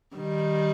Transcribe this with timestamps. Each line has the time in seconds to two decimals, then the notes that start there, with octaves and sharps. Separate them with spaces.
0.16 D#3 G3